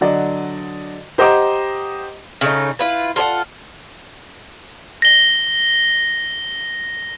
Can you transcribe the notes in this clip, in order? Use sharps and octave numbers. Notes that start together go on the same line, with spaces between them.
D3 F#3 D5 D#5
G4 C5 D#5 F#5 A#5 D6
C#3 A3 D#4
E4 F4 B4
F4 A4 D5 F#5
A#6 G7